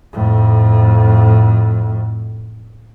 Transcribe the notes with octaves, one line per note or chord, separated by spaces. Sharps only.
F2 A2